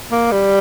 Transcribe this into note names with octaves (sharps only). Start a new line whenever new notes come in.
A#3
G3